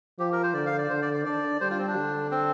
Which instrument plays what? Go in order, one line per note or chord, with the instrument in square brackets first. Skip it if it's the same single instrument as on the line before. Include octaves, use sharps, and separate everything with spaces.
[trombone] F3 [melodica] G4
[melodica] A#4
C5
[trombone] D3 [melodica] D5
[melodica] F5
D5
[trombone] D3 [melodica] C5
[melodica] D5
D5
[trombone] D4 [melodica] D5
[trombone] G3 [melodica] C5
[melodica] F4
C4
D4
[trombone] D3
[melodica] C4